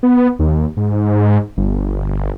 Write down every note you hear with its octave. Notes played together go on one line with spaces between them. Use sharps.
B3
D#2
G#2
G1